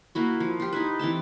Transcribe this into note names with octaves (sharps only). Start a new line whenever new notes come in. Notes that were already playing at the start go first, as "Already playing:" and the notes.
A#3 E4 F#4
F3
F4 G4
D#4 E4 B4
E3 C4 G5 A5